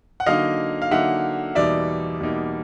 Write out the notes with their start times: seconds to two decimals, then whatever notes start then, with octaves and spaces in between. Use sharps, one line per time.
0.20 F#5
0.26 D3 F#3 A#3 D#4 D#5 F5
0.82 F5
0.91 D3 F#3 A#3 D#4 E5 F#5
1.55 E2 B2 G3 A#3 D#4 D5 E5
2.20 E2 B2 G3 A#3 D#4